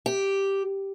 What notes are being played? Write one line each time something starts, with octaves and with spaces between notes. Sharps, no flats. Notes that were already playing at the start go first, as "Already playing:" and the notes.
G4